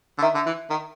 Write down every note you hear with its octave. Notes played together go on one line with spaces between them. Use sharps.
D3
D#3 E5
D3
E3
D#3